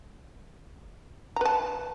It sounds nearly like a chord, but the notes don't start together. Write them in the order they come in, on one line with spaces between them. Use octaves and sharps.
A#5 B4 A5